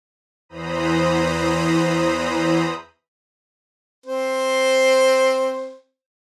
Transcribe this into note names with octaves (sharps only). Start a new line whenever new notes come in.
E2 E3 C5 A#5 B5 D#6
C4 C5